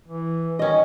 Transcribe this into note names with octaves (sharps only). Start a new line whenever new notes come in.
E3
D#3 C#4 D#5